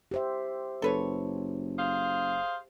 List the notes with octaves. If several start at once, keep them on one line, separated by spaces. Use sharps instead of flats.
G4 C5 E5
F#1 A4 B4 C#5
G#4 C5 F5